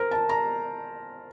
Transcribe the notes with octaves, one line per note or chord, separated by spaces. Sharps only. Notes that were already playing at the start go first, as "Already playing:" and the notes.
Already playing: A#4 C5
A5
A#5